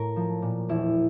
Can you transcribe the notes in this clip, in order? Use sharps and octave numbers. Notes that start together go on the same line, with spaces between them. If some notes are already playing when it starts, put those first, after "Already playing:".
Already playing: A2 A#4
F3
A#2
E1 E4